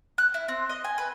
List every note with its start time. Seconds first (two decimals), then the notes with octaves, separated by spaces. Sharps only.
0.18 F#6
0.34 E4
0.48 C4
0.70 D#5
0.84 G#5
0.98 B4